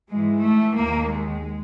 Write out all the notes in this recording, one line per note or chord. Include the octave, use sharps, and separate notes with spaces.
G#2 E3 G#3
A3
D#2 D#3 A#3
G#3